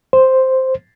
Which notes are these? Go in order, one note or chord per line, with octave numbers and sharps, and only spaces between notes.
C5